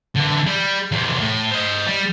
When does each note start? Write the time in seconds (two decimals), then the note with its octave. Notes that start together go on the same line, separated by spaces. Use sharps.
0.16 D3 E3
0.47 G3
0.92 E2 C3
1.20 A2
1.51 C5 D#5
1.87 G3